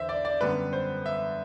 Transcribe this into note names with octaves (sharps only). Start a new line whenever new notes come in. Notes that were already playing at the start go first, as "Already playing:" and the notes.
Already playing: E2 D3 C5 E5
D5
D5
F#2 D3 G3 B3 B4
C5
E5